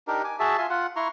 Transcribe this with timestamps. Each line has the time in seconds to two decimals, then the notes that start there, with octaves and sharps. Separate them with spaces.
0.08 D4 D#4 G4 A#4
0.24 G#5 D6
0.39 F#4 G#4 E5 A5
0.58 F4 E5 G#5 C6
0.70 F4 F#5
0.96 E4 A#5 C6 C#6